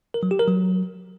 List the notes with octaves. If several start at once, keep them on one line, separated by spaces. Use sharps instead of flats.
A#4
F#3
G4
A#4
F#3